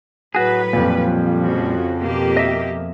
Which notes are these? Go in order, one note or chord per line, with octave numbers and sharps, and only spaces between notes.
A2 F#3 F#4 G#4 B4
F2 A#2 G3
C#3 F3 F#4
B2 A#3 G4
D#5 E5